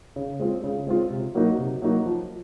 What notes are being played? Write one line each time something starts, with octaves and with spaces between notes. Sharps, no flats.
C#3
G#3 C4 F4
C#3
G#3 C4 F4
C3
F#3 A#3 D#4 F#4
C3
F#3 A#3 D#4 F#4
F3